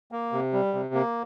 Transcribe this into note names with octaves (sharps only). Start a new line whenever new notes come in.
A#3
C3
G3
C3
A#3